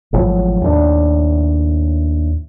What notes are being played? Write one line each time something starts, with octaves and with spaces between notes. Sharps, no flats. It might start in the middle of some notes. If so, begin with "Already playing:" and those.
G#1 A2 F3 F#3
D#2 A2 C#4 D4